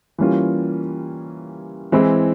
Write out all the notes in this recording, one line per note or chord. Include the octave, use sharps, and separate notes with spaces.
E3 G3 A#3 C#4 F4
E3 G#3 C4 E4